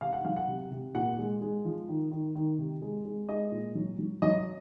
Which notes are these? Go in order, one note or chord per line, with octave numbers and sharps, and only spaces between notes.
C3 F5
F#5
F#3 F5
F#5
C3
C3
A#2 F#5
G#3
G#3
F3
D#3
D#3
D#3
C3
G#3
G#3
G#3 D#5
A#2
F#3
F#3
F#3 D#5